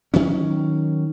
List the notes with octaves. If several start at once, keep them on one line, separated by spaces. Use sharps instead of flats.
D#3 F#3 C#4